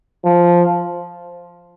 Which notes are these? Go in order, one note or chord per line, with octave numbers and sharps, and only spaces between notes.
F3